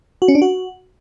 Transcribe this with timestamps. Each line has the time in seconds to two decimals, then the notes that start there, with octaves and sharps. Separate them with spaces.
0.22 F#4
0.28 C#4
0.35 D4
0.42 F#4